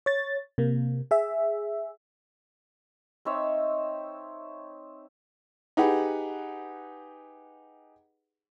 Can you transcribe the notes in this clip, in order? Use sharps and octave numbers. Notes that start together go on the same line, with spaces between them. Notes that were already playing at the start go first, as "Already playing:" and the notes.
C#5 A6
C3 A#3
G#4 E5
C4 D#4 C#5 E5
D#4 G4 G#4 B4 F#5